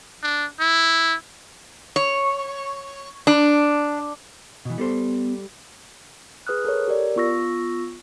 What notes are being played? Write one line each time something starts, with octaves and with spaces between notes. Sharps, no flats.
D4
E4
C#5
D4
B2 E3
G3 B3 A4 C5
G#4 B4 D#6 F6 F#6
A4 A#4 C#5
G4 A#4 D5
B3 F4 C#6 E6 A#6